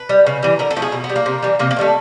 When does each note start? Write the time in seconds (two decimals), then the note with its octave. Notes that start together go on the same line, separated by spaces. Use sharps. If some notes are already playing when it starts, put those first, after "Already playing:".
Already playing: B4
0.09 G3
0.27 C#3
0.43 E3 G3
0.59 D3 A#4
0.71 A4
0.76 F3 A3
0.82 G#4
0.92 B2
1.04 B3
1.09 G3
1.16 A#3
1.26 C3
1.43 E3 G3
1.59 C3 A#3
1.71 A#3
1.76 D#3 G3 A3